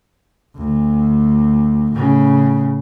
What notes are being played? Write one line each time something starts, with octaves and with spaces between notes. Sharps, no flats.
D2
A2 C#3